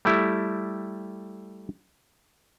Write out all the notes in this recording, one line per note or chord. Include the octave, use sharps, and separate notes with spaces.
G3 A3 E4 G4